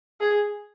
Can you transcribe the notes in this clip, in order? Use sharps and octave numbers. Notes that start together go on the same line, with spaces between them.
G#4